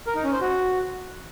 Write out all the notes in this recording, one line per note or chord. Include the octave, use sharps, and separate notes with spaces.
A#4
D#4
C#4
C5
F#4